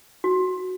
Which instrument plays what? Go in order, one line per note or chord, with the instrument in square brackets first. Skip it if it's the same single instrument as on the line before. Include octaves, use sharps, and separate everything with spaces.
[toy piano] F#4